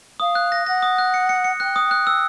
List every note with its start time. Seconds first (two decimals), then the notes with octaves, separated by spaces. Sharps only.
0.20 F5 D#6
0.35 F#6
0.52 A#6
0.66 F#5 A#6
0.82 D#6
0.98 F#6
1.14 C#7
1.29 C#7
1.44 C#7
1.60 G5 F#6
1.76 D#6
1.83 G5
1.91 F#6
2.07 E6